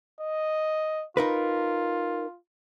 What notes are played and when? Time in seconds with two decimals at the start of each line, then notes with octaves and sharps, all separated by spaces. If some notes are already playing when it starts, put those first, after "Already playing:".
0.21 D#5
1.17 D#4 F4 A#4 B4